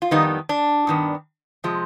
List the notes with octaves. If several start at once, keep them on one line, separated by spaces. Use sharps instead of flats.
F4
F2 D#3 G3 B3 D#4
D4
G2 D#3 B3
C3 F3 G#3